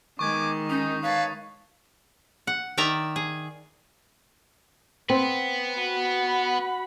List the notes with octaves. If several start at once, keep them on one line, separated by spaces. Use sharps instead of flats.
D#3 G#3 B3 G#5 C#6 D6
C#4 D#4 D#6
B4 C#5 F5 A5
F#5
D#3 D5 E5 A#5
G#4
B3 C4 B4
F#4 B5